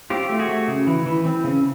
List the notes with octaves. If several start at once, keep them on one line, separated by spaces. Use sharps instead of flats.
C4 F4 G4
A3
F#4 G#4
A3
C#3
E3
E3
C4
C#3